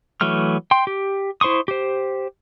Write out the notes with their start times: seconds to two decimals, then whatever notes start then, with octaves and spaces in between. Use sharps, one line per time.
0.21 E3 F#3 A3 F6
0.71 G5 C6
0.87 G4
1.41 E4 C5 C6 C#6 D#6
1.68 G4 C5